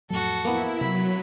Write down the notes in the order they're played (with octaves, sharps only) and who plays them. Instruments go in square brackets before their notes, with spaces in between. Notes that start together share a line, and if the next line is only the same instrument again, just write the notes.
[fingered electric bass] F2 A2 F#3 [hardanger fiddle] F#4 A4
[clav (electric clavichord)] A#3 B3 [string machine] E4
[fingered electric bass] C3 [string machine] F#3 [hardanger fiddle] B5